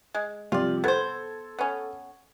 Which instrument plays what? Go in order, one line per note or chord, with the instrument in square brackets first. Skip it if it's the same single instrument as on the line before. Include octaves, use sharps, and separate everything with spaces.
[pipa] G#3
[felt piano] C3 F3 G3 [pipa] F4 D5
[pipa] B3 C5 [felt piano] A4 G#6
[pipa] B3 C#4